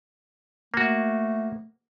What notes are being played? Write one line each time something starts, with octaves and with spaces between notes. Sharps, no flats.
A3 A#3 F#4